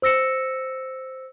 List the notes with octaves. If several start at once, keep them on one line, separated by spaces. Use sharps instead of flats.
C5 E6 A#6 C#7 E7